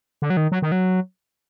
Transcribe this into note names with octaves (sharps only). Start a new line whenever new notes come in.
D3
F#3
D#3
F#3
D#3
F#3